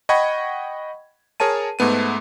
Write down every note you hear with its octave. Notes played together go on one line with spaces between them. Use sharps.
D#5 F#5 G5 B5 C#6 G#6
G#4 A#4 C#5 A5 D#7
G#2 A3 B3 D#7